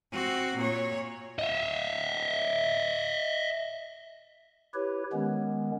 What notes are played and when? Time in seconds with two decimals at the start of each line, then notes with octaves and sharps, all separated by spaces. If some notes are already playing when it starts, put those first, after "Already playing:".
0.13 C4 F#4
0.57 A#2 C#5
1.39 D#5 E5
4.74 E4 G4 B4 C#5
5.13 D#3 G#3 B3 C#4